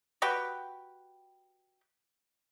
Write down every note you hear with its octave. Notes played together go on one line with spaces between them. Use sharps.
F#4 G4 B4 G5